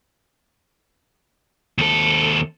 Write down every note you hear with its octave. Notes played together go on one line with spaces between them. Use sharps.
D#2 A4